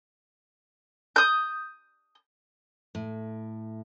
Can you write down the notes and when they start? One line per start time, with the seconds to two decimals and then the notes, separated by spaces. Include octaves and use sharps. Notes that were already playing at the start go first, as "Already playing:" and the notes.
1.16 D#6 G6
2.95 A2